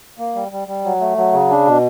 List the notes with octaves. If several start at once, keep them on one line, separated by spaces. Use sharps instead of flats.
A#3
G3
G3
G3
F#3
A3
F#3
C#3
D4
B2